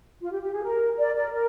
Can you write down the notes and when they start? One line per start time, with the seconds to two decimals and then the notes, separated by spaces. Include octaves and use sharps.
0.21 F4
0.31 G4
0.42 G4
0.53 G#4
0.64 A#4
0.98 A#4 D5
1.15 A#4 D5
1.33 A#4